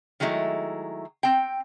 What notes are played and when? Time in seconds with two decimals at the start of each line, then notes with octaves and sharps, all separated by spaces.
0.20 D#3 F#3 G#3 A3 E4
1.23 C4 G5